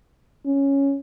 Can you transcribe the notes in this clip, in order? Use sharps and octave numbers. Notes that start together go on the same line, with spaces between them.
C#4